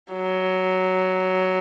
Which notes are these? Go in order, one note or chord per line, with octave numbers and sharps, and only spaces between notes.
F#3